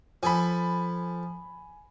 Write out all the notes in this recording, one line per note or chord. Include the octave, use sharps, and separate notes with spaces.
F3 A4 G#5 B5